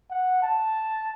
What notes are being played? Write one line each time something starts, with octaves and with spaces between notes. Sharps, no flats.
F#5
A5